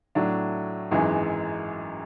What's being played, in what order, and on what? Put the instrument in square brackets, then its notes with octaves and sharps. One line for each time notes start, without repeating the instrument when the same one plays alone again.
[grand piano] A2 F#3 A3 D4
G#1 F#2 E3 G#3